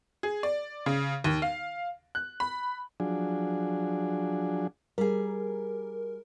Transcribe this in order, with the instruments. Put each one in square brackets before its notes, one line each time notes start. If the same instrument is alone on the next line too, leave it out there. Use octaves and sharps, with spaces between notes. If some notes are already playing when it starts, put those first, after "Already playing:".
[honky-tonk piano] G#4
D5
C#3
D#2
F5
F#6
B5
[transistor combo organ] F3 F#3 D4 G#4
[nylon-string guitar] G3 G#4 [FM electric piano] A#4